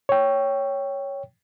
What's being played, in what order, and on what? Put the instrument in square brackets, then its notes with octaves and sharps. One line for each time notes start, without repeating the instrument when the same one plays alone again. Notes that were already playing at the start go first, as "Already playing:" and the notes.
[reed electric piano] C#5 G5